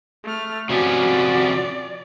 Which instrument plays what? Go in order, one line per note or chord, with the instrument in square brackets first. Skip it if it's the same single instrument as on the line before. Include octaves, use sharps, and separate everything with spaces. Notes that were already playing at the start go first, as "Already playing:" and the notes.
[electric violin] A3 F6
[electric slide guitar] C3 F3 C#4 [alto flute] F#4 [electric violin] D5